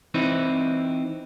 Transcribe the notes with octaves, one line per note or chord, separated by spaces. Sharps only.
E3 C4 D#4 E4